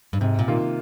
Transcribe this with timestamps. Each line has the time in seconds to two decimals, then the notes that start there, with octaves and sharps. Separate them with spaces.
0.13 G2
0.21 G#2 C3
0.39 A#2
0.48 D#3 A#3 F4